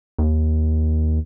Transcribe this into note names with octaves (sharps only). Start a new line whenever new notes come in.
D#2